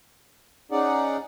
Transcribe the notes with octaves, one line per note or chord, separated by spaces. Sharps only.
C#4 D#4 G#4 D5 F#5